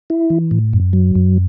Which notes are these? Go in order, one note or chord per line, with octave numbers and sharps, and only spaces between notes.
E4
E3
A2
F#2
F#3
F#2